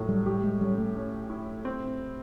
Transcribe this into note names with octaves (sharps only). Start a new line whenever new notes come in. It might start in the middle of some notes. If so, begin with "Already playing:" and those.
Already playing: A2 F#3 A3
G3
G3 G4
G#3
G3 C#4
A3
C#4
E4
C4